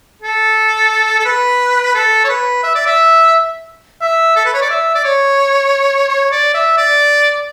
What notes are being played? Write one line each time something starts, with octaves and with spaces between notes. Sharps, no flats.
A4
A4
B4
A4
C#5
B4
E5
D5
E5
E5
A4
B4
C#5
D5
E5
D5
C#5
C#5
D5
E5
D5